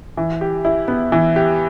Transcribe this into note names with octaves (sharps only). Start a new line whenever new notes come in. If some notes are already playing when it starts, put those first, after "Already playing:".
E3
G4
E4
B3
E3
G4